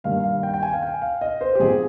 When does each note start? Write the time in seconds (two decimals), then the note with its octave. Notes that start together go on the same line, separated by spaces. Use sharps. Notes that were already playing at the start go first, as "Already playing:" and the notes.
0.04 G2 D#3 G3 A#3 D#4 F5
0.24 F5
0.43 G5
0.54 G5
0.63 G#5
0.73 F5
0.82 G5
1.02 F5
1.21 D#5
1.41 C5
1.55 G4
1.60 G#2 F3 C4 G#4